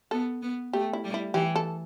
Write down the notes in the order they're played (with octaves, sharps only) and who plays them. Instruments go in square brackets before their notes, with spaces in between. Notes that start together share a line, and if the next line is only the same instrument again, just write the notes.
[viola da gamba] B3 [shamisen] A4
[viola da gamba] B3
[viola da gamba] A3 [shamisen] G4
[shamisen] E4
[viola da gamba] G3
[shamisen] E4
[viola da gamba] E3 [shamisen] G4
[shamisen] A4